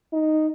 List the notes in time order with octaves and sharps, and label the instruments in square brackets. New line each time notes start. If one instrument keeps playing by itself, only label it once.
[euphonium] D#4